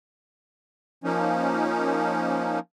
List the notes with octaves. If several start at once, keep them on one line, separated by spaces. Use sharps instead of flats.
F3 A#3 C#4 D#4